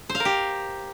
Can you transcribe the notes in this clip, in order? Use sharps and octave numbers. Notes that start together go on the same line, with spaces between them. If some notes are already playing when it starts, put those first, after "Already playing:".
C5
F5
A#4
G4